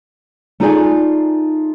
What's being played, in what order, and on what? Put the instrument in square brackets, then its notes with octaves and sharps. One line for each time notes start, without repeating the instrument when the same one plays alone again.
[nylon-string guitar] A3 D#4 F4 G#4 D5 G#5